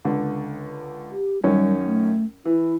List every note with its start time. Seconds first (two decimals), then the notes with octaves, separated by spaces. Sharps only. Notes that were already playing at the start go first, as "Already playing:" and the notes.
0.05 C#2 D3
1.11 G4
1.44 F#2 D#3 G3 C#4
1.85 A3
2.45 E3 E4